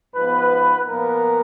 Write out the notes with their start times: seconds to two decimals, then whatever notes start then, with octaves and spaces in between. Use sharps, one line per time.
0.15 G#2 F3 B3 B4
0.88 A#2 F3 B3 A#4